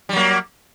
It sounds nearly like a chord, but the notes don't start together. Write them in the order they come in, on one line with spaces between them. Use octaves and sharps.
G3 F#3 A#3